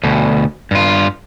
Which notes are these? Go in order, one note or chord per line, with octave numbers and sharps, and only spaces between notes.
D2 B2
G2 F4